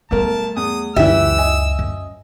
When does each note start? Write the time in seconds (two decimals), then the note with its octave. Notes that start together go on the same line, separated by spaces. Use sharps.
0.11 B1 G3 A3 A#4 A5
0.56 E2 D#6
0.96 C#2 F#2 E3 G4 E5 E6
1.38 D#5 G#5
1.79 F#2